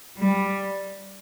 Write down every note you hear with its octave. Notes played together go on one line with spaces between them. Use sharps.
G3